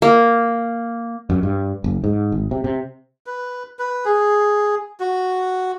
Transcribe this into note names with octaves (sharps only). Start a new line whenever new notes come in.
A#3
F#2
G2
F#1
G#2
G#1
C3
C3
B4
B4
G#4
F#4